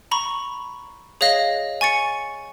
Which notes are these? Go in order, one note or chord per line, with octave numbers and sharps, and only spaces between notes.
A#5 B5 C#6
G#4 C#5 D#5 F5 A#6
G#5 C#6 A6 C#7